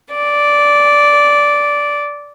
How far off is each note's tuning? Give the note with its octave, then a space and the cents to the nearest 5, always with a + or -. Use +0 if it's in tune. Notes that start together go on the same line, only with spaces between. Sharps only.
D5 -10